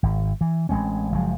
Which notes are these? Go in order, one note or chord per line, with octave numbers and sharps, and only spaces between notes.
G#1
E3
A1 G#3 C4 C#4
F#1 F3 F#3 G#3